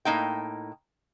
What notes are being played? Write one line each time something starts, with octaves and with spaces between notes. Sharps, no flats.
A2 A#3 D#4 G5